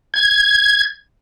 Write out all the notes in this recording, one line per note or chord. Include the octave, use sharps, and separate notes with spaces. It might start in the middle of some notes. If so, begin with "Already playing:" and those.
G#6